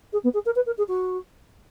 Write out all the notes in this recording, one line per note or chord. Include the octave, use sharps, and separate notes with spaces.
G#4
B3
G#4
A#4
B4
A#4
G#4
F#4